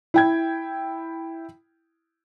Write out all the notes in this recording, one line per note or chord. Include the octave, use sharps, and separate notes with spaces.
E4 G5 G#6